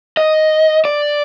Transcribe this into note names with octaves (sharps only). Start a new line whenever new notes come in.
D#5
D5